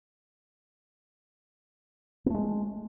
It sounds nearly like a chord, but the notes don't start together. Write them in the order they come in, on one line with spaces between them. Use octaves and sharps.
B3 A3 G#3